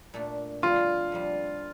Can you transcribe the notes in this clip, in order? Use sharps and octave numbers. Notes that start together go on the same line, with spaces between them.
A#2 A3 D4
F2 D3 G3 F4
F2 D3 G3